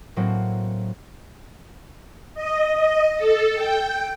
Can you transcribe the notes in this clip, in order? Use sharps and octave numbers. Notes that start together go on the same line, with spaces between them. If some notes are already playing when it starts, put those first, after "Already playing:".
A2 F#3 A#3 C4 F#5
D#5
D#5
A4
G5